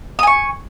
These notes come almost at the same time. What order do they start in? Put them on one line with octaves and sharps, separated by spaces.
D#6 G#5 C#6